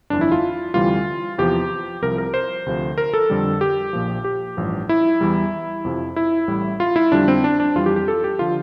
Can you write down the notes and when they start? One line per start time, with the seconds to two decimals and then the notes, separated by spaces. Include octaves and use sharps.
0.10 G1 F2 E3 D4
0.21 E4
0.32 F4
0.74 D2 C3 E3 G3 F4
1.38 E2 C3 F3 G4
2.02 C2 C3 F3 A#4
2.18 A#4
2.34 C5
2.66 D2 C3 F3
2.98 A#4
3.14 A4
3.30 F2 D3 G3
3.61 G4
3.93 A#1 A#2 F3
4.24 G4
4.57 A1 G2 F3
4.89 E4
5.21 E2 E3 G3
5.85 F2 C3 F3
6.16 E4
6.48 A1 A2 G3
6.80 F4
6.96 E4
7.12 F2 D3 G3 D4
7.28 C4
7.44 D4
7.60 D4
7.76 F2 E3 G3 F4
7.86 G4
7.96 G4
8.08 A4
8.24 G4
8.39 D3 F3 F4